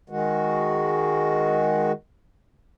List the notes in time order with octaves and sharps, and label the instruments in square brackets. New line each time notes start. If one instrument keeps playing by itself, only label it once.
[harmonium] D#3 G#3 F#4